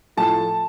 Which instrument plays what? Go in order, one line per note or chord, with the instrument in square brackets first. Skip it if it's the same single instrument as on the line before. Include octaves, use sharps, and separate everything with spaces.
[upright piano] A2 F3 A3 A5